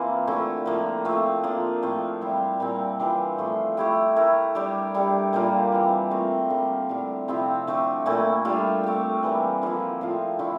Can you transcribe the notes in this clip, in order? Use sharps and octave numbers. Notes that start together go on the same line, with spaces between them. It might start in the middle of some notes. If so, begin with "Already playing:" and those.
Already playing: E3 A#3 C4 F4
D3 A3 E4
A2 F3 A#3
A3 C4 F4
F3 A#3 D4
A2 F3 A3 C4
G3 C4 E4 G4
A#2 G3 C4
E3 G3 D4 F4
A2 F3 A3
A3 E4 G4
A3 E4 A#4
G3 D4 G4
G3 D4 A4
A#2 G3 A#3 F4
E3 G3 C4
A3 C4 F4 A#4
D3 G3 A#3
A2 G3 D4
C3 F3 C4 E4
D3 A3 D4
A#2 A3 E4 A4
G3 D4 F4 A4
A3 C4 G4
E3 G3 A#3
D3 F3 A#3 E4
A2 F3 C4 F4
D3 A3 E4